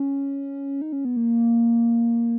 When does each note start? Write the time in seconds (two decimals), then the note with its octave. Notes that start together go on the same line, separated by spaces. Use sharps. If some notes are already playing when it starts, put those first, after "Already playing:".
Already playing: C#4
0.82 D#4
0.92 C#4
1.05 B3
1.17 A#3